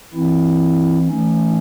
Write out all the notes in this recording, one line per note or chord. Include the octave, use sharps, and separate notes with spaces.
E3 C4 E4
E3 A3 C#4 D#4